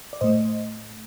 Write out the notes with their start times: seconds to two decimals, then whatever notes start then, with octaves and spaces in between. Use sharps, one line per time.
0.13 D5
0.21 A2 A3 C5 D#5